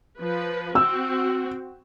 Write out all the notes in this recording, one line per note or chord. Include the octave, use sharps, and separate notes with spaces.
F3 B4
C4 F#4 E6